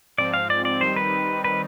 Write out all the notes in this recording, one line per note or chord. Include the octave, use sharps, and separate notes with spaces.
G#2 F3 C4 D5
F5
D5
D5
D#3 G3 C4 D#4 C5
B4
B4